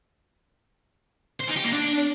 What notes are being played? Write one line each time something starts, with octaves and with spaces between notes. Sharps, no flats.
C5
D#4
G4
A#3
D4